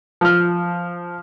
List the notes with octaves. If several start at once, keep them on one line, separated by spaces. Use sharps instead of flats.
F3 F6